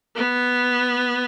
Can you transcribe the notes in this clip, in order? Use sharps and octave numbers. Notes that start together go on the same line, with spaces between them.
B3